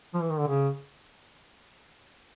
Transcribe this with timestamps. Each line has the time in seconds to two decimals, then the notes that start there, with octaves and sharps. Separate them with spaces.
0.14 F3
0.22 E3
0.30 D#3
0.39 D3
0.48 C#3